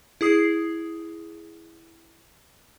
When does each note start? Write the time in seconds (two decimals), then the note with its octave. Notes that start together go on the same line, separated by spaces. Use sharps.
0.21 E4 G#4 D#6 C7